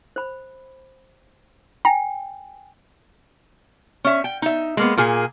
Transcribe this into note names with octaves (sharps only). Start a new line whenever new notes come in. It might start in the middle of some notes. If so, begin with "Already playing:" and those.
C5 B5
G5 G#5 A#5
C#4 E5
G5
D#4 E5
G#3 A#3 B3
A#2 A#3 G#4